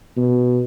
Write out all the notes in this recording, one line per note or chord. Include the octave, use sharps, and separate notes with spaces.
B2